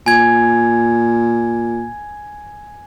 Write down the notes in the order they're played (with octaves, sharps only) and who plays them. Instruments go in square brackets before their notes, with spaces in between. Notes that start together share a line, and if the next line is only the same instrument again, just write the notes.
[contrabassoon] A#2 [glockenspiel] G#5 G#6